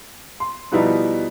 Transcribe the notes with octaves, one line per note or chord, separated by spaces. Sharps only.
C6
B2 F3 G3 B3 D#4 E4